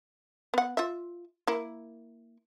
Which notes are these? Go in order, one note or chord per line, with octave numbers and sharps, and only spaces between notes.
B3 F#5
F4 E5
A#3 E4